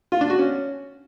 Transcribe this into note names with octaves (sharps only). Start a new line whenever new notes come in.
F4
D4
F#4
C#4